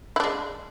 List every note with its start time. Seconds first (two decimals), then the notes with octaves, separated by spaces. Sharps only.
0.16 E4
0.20 D4
0.24 G#3